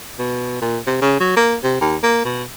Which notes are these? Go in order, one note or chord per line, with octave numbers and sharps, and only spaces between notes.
B2
A#2
C3
C#3
F#3
A#3
C3
D#2
A#3
B2